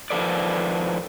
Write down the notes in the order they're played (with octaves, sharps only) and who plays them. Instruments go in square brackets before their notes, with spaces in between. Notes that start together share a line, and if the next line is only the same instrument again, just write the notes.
[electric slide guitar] D#3 F3 A4 B4 D5